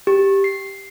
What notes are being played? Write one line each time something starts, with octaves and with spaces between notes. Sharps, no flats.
G4
C7